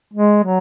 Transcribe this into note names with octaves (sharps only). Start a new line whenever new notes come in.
G#3
F#3